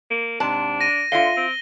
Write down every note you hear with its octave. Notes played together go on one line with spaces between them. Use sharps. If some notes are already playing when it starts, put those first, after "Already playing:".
A#3
G#2 C3 D4 A5
A#6 D#7
D3 F4 E5 F5 G7
C4